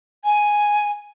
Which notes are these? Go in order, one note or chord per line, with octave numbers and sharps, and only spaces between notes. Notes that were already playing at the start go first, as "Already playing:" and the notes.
G#5